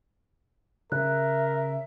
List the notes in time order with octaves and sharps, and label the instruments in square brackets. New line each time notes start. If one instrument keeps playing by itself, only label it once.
[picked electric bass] C#3 [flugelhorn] A#4 [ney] E5 [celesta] F#6